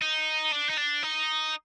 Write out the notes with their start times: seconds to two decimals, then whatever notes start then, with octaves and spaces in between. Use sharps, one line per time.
0.02 D#4
0.52 D4
0.70 D#4
0.78 D4
1.03 D#4